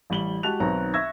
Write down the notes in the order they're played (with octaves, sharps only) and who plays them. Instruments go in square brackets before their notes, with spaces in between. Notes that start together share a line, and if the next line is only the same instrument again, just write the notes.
[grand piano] A1 G3 F#7 G7
G#3 F#4 G4 A5 F#6 F7
B1 D#3 B3 C4 C#5 A#5
E5 C#6 E6 G#6 A#6